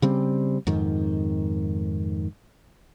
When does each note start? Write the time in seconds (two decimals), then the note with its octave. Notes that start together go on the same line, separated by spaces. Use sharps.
0.02 C#3 G3 C4
0.67 F2 G#2 D#3